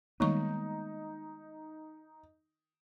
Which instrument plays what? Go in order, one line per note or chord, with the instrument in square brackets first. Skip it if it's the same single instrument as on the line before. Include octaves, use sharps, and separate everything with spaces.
[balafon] D#3 G3 C#6 [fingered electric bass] G#3 A#3 B3 [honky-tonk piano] D#4